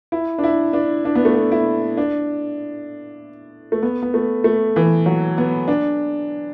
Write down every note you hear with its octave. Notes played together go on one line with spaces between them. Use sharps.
E4
D4
E4
D4
D4
B3
A3
B3
E4
D4
A3
B3
B3
A3
A3
E3
F#3
B3
D4